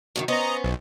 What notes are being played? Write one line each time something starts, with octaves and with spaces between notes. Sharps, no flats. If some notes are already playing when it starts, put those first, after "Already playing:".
F#2 B2 D#3
B3 C#4 C5 D#5 A#5
B1